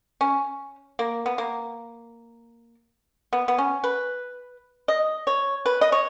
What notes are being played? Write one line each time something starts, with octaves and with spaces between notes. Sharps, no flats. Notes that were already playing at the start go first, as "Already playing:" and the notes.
C#4
A#3
B3
A#3
B3
B3
C#4
B4
D#5
C#5
B4
D#5
C#5